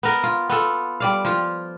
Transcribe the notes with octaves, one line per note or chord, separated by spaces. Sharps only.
B3 A#4
F4
B3 F4 A4
G3 D5 F5
F3 F4